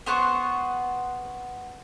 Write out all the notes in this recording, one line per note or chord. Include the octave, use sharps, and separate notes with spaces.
B3 C5 F#5 C#6